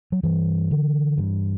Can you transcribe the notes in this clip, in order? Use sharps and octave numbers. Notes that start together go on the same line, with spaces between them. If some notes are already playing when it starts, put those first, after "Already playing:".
F#3
G2 E3
D3
G2